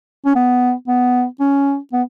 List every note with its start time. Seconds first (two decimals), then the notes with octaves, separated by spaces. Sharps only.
0.25 C#4
0.35 B3
0.87 B3
1.40 C#4
1.93 B3